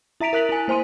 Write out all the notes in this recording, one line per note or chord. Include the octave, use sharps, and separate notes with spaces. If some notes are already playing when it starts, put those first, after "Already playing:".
E4 E5 A#5 B6 D7 F7
A#4 E5 F#6 B6 F#7
E4 G#5
A#3 C5 G#5 C6 D#7